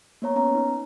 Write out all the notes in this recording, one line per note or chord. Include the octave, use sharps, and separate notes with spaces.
A#3 B3 C#5 A#5
B3 C#4 A#5
D#4